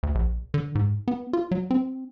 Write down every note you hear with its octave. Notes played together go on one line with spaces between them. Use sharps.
D2
A#1
D3
G#2
B3
F4
F#3
C4